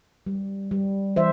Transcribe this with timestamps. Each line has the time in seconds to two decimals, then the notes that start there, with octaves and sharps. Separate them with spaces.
0.27 G3
0.71 G3
1.16 E3 C5 E5